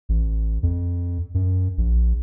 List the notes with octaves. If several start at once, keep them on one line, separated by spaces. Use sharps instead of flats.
A1
F2
F#2
A#1